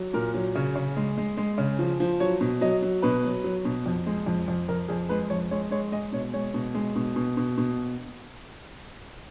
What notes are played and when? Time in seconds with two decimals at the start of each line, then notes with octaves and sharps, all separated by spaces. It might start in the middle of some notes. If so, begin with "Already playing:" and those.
Already playing: F#3
0.14 A#2 A#4
0.34 F#3
0.55 C#3 C#5
0.75 C#3
0.97 G#3
1.18 G#3
1.37 G#3
1.58 C#3
1.79 F3
2.00 F3
2.20 F#3 C#5
2.41 B2
2.61 F#3 D#5
2.82 F#3
3.02 B2 B4
3.24 F#3
3.44 F#3
3.65 B2
3.86 F2
4.06 G#3
4.26 F2
4.48 F2
4.68 F2 A#4
4.88 F2 G#4
5.09 G#3 B4
5.30 F2 C#5
5.51 G#3 C#5
5.71 G#3 C#5
5.92 G#3 D#5
6.13 B2 C#5
6.33 G#3 C#5
6.54 B2
6.75 G#3
6.96 B2
7.16 B2
7.37 B2
7.58 B2